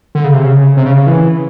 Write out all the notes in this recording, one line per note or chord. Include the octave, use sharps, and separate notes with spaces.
D3
C#3
C3
C#3
C3
C#3
C#3
E3